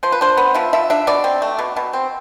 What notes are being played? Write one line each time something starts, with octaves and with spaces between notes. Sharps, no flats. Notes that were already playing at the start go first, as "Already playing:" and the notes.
F3 C5
B4
D4 C5
B3
F3 E5
F3 E5
D4 E5
B2 D5
C4
A3
B2
B2
C4